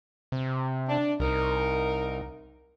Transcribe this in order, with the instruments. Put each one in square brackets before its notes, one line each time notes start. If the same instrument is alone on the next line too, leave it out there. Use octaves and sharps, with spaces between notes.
[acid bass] C3
[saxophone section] D4
[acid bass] C2 [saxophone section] D#4 A#4